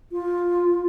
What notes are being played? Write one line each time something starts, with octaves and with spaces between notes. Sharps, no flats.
F4